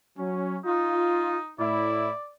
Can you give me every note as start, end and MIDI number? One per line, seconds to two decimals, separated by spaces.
0.17 0.58 54
0.17 0.58 61
0.66 1.50 63
0.66 1.37 65
1.59 2.10 45
1.59 2.10 64
1.59 2.32 74